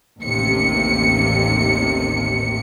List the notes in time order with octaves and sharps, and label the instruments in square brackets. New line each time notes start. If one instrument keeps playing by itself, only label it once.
[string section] A1 D#2 C3 C#7